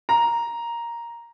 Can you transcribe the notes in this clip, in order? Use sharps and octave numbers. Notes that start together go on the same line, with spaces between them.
A#5